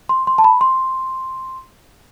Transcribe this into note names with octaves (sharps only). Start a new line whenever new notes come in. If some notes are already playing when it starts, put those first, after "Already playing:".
C6
C6
A5
B5
C6